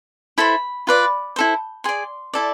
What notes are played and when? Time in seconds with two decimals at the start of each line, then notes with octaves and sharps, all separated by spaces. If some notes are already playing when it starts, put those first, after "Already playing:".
0.38 E4 A4 C5 B5
0.87 F4 B4 D5
1.36 E4 A4 C5
1.84 G#4 D5 C6
2.34 E4 A4 D5